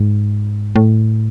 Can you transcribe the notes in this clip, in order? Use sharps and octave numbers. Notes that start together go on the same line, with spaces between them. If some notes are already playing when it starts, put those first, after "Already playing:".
Already playing: G#2
A2